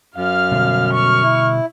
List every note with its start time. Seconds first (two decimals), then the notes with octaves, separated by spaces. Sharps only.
0.16 F#2 F5 F6
0.52 B2 D3 G3
0.93 C#6 F6
1.23 E4